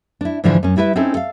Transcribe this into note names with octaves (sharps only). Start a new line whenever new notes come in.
D4 E4
G#2 D3 E3 F3 D4
F#2 C#4
G3 E4 B4 E5
C4 C#4 D#4 E4 A4
A4 F5